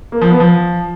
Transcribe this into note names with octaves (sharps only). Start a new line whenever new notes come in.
A#3
F3
B3
F3